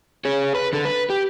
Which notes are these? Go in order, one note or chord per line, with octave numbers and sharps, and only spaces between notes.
G#4 C#5
B4
D3 A4
B4
G4